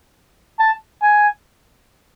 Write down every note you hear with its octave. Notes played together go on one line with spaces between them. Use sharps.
A5
G#5